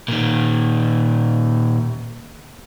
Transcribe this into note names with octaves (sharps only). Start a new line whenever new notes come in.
A#2 D#3